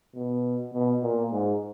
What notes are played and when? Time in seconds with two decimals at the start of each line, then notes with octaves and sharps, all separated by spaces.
0.16 B2
0.74 B2
1.03 A#2
1.32 G#2